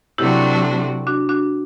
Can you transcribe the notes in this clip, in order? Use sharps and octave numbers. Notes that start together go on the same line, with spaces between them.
C3 F#3 A3 D4 E4 F#4 G4
D4 F#4
D4 F#4